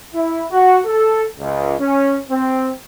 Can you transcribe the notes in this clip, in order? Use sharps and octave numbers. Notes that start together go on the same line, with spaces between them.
E4
F#4
A4
C#2
C#4
C4